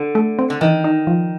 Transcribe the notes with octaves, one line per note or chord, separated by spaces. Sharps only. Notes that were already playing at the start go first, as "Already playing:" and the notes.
Already playing: D3
A3
C4
D3
D#3 E3
D#4
F3